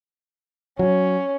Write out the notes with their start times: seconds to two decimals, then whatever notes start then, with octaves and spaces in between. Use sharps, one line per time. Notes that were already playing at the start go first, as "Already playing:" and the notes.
0.79 F#3 C#4